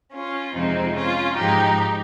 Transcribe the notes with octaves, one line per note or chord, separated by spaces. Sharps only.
C#4 F4
F2 C3 F3 G#3 C4 D#4
C#4 F4
G#2 F3 G#3 D#4 G4